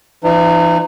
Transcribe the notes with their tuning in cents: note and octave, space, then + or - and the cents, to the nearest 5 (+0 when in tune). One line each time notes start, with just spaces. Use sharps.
E3 +40 D#4 -30